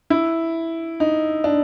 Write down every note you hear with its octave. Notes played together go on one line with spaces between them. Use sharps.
E4
D#4
D4